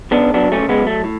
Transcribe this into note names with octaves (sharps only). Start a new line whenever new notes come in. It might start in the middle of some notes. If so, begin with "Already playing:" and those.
C#3 B3 D4
F#3 B3 D4
A3 C#4
C#3
G#3 B3
F#3
A3
A2